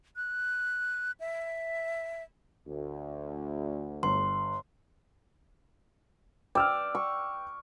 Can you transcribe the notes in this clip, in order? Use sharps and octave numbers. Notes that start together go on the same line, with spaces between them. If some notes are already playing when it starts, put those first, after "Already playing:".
F#6
E5
D2
G1 C6
D5 G5 E6 F6
C#6